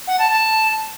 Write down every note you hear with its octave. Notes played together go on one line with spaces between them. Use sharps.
F#5
A5
A5